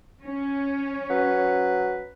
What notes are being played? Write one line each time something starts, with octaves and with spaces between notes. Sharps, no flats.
C#4
F#3 B4